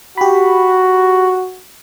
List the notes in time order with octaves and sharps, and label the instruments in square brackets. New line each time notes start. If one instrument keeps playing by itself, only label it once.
[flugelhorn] F#4 [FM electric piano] G4 B5